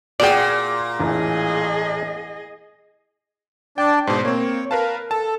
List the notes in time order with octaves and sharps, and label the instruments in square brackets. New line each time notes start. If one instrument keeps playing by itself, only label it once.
[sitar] A#2 [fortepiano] F#4 G#4 [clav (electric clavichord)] D5 G5
[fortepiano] A1 [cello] G#4 D#5
[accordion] D4 D5 A5 [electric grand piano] G5
[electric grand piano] G#2 B2 [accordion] C5
[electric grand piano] A#3 C4 [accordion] C#5
[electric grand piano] A#4 B4 A5 [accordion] F5
[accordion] A4 [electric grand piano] A5